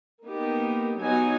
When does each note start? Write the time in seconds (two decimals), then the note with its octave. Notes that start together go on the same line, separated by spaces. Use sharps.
0.24 A#3 B3 D#4 G4
0.98 F#3 B3 D#4 F#4 G#5